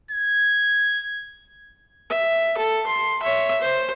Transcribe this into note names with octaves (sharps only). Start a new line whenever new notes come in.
G#6
E5
A4
C6
C#5 E5
C5